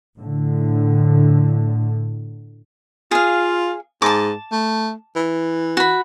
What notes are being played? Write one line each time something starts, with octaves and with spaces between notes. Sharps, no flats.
A2 D3
F4 G#4 F5
G#2 A5 D6
A3
E3
F#4 B5